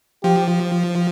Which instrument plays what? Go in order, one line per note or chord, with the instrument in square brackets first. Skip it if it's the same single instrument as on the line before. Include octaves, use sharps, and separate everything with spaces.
[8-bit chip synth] F3 [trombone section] G4